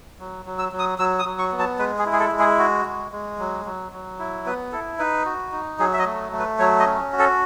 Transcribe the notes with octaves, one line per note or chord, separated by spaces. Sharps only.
F#3
F#3
E6
F#3
D#6
F#3 E6
D#6
F#3
C#6
B3
A5
G#3 B4
G#4
E4
G#4
A4
G#3
G#4
F#4
G#3
G#3
F#3
F#3
F#3
E4
B3 B4
E4 A4
D#4 B4
F#4
D#4
F#3 G#4
E5
D#5
A3
A3
B4
F#3 C#5
D#5
C#4
F#4
A4